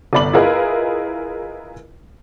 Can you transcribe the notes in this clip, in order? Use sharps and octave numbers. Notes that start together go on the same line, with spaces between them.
G1 C2 D5 B5 F#7
E4 F4 G#4 A#4 B4 D#5